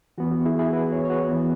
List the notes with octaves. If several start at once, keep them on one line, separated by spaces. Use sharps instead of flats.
E3 B3 F#4
F#4
E4 G#4
E4 G#4
F#4 B4
G#4 C#5
C#5
F#4 B4
E3 B3